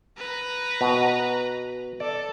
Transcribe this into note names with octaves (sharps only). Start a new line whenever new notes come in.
B4 A#5
B2
A4 D5